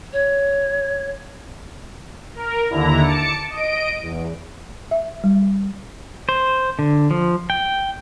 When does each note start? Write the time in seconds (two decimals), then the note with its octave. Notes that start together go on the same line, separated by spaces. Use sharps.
0.13 C#5
2.35 A#4
2.70 D#2 D3 E4 A#5
3.01 A5 D6 C#7
3.50 D#5 D7
4.03 E2
4.91 E5
5.24 G3
6.29 C5
6.79 D3
7.11 F3
7.50 G5